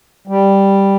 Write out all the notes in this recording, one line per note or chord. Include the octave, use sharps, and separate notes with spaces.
G3